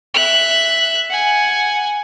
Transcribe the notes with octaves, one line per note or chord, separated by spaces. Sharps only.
E5 F#6
F#5 G#5